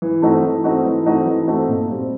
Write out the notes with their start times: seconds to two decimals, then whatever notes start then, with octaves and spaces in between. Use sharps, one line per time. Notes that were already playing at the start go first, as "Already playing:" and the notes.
0.02 E3
0.22 A3 C4 D#4 F#4
0.43 E3
0.64 A3 C4 D#4 F#4
0.85 E3
1.05 A3 C4 D#4 F#4
1.26 E3
1.47 A3 C4 D#4 F#4
1.68 A#2
1.90 G3 C4